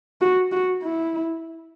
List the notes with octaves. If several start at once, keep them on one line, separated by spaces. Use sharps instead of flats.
F#4
F#4
E4